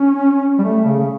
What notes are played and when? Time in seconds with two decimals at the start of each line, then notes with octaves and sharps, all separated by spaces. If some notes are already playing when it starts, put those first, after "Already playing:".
Already playing: C#4
0.58 G3
0.64 A3
0.84 C#3
0.99 C#3